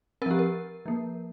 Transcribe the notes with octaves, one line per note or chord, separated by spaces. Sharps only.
F3 C4 G4 A#4
A#4
F3 A#3